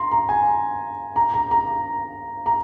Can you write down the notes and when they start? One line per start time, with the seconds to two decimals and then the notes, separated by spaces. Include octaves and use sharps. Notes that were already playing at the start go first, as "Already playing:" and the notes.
Already playing: A#5 C6
0.11 A#5
0.29 G#5
1.16 A#5
1.34 A#5
1.51 A#5
2.46 A#5